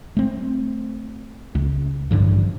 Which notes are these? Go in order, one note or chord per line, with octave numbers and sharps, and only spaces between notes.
A3 C4
C#2
A1 G2 D3 F3